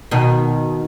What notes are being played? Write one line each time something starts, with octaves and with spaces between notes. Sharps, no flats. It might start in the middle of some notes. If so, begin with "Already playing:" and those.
B2 D#3